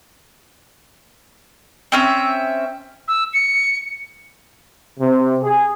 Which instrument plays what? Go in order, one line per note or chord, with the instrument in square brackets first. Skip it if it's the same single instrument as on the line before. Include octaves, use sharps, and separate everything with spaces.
[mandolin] C4 C#4 E5
[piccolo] E6
C#7
[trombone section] C3
G#4